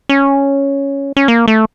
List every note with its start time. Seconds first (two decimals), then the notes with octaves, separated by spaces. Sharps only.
0.09 C#4
1.17 C#4
1.28 A#3
1.48 A3